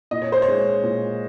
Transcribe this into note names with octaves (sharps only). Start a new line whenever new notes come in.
A#2 D#5
C#5
C5
C#5
G#3
A#2